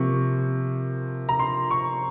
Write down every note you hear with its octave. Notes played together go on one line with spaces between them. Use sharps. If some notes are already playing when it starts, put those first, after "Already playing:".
Already playing: C3 F3 A#3 C#6
A#5
C6
C#6